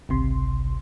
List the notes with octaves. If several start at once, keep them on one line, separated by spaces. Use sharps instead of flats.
G#1 C#2 C3 C6